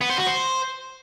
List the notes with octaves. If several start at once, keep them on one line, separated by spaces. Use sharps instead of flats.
B3
C5
F#4
C5